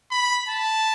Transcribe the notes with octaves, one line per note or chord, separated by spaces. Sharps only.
B5
A5